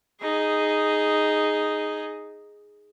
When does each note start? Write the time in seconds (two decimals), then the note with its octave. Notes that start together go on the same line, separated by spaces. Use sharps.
0.21 D#4 G#4